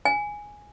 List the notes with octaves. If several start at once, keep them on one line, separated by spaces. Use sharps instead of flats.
G#5